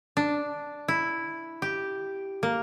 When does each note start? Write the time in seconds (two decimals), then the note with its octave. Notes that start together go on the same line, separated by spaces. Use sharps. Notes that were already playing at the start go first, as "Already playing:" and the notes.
0.17 D4
0.88 E4
1.62 G4
2.43 A#3